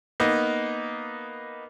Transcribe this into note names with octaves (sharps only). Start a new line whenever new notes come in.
A#3 B3 D#4